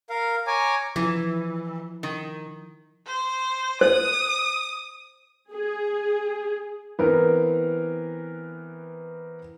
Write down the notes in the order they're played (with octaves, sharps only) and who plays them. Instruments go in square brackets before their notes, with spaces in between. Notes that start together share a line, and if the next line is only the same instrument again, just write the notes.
[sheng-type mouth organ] A#4 F5
C#5 G#5 A#5 D6
[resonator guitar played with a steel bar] E3 [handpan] F3 E4
[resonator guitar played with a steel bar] D#3
[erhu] C5
[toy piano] C5 [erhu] D#6
[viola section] G#4
[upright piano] E3 B3 C4 A#4